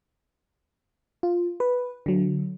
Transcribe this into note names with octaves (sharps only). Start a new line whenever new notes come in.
F4
B4
D3 F#3